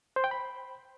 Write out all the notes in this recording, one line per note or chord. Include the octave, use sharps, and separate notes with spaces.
C5
G5
B5